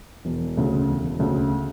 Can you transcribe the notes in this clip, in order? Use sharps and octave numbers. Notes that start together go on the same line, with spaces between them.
E1
D2 C#3
E1
D2 C#3